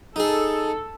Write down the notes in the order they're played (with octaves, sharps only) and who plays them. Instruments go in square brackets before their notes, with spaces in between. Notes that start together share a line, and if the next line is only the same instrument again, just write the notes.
[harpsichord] D#4 G#4 [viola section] A4